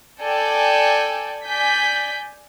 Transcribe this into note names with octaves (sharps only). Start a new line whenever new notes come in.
A4 D5 G5 G#5
D5 G#5 G6 B6